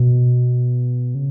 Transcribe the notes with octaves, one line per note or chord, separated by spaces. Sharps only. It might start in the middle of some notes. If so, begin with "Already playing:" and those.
Already playing: B2
C#3